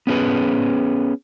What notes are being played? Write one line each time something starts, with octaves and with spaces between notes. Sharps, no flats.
B3 C#4 G#4 B4